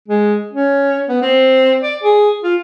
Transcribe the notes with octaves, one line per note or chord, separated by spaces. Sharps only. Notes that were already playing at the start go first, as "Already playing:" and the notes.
G#3
C#4
B3
C4
D5
G#4
F4